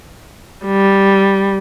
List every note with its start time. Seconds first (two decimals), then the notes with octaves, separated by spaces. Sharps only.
0.66 G3